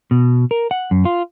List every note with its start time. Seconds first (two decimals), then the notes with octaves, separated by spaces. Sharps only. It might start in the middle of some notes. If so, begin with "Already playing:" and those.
0.11 B2
0.51 A#4
0.71 F#5
0.91 F#2
1.05 F4